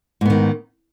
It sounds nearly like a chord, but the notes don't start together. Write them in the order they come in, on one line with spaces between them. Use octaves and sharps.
G#2 B3 D#3